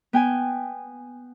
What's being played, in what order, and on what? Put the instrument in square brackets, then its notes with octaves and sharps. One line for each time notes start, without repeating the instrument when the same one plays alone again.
[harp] B3 G5 G#5